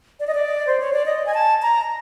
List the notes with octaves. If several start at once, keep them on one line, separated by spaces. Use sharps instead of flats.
D5
D#5
D5
C5
C#5
D5
D#5
G#5
A5
A#5